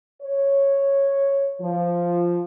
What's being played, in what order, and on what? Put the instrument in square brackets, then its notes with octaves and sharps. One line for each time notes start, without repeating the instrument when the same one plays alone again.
[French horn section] C#5
F3